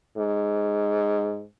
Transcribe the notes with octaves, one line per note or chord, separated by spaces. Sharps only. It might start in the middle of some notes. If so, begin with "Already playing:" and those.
G#2